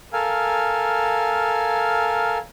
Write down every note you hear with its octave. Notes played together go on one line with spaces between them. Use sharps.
A4 A#4 F5 G#5